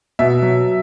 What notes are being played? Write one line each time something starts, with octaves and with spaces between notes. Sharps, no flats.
B2 E5
F#3